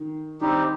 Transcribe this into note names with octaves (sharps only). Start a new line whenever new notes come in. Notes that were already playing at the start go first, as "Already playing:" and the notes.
Already playing: D#3
D#3 G3 C4 D#4 G4